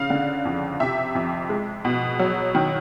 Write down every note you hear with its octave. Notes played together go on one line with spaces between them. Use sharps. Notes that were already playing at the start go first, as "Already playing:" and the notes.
Already playing: C#3 F5
D3
F2
C3 E5
F2
G#3
B2
F#3
D#3